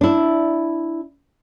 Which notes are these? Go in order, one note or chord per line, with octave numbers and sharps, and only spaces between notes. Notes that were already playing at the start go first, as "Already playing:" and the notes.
D4 E4